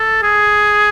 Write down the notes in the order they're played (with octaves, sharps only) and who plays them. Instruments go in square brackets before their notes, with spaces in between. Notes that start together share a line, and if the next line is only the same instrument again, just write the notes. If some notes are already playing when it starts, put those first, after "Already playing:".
Already playing: [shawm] A4
G#4